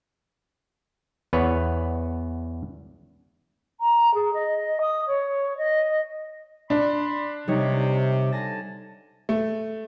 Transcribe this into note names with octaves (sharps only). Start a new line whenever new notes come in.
E2 B3 B4 C#5
A#5
G#4
D#5
D#6
C#5
D#5
D4 B5 C6
C3 G3 D#4 C#5
D3 G#5 A5 A#6
A3